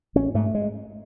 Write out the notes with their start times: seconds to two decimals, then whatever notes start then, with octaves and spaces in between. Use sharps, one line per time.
0.15 A1 C#4
0.34 G#2 A3
0.55 G#3